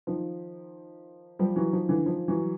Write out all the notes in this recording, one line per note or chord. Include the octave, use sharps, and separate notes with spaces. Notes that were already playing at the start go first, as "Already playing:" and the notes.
D#3 F3
F3 G3
E3 F#3
D#3 F3
D3 E3
D#3 F3
E3 F#3